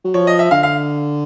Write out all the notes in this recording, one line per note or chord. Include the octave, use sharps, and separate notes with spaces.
F#3
F3 C#5
D#5
E5
D3 F5
F5